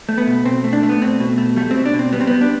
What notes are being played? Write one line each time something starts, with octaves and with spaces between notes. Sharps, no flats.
A3
B3
B2
B2 C4
A3
D4
A3
B3
B2 C4
B2
A3
G3 A3
B2 C4
D4
B2
C4
G3 B3
C4
G3 B3
D4